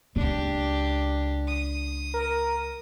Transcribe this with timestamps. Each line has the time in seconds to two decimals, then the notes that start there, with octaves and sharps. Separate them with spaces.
0.16 C#2 D4 G4
1.48 D#6
2.14 A#4